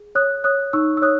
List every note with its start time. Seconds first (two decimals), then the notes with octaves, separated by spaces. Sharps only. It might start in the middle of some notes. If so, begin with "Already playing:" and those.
Already playing: G#4
0.15 C#5 D#6 F#6
0.44 C#5 D#6 F#6
0.73 D#4 C#6 E6
0.97 E6
1.02 C#5 D#6 F#6